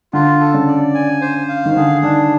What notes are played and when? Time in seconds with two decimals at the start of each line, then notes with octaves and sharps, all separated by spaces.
0.13 D3 F4
0.40 A4
0.54 C#3
0.67 D5
0.94 G#5
1.21 C5
1.49 F5
1.65 D#3
1.76 D3 G#4
2.03 D#3 D4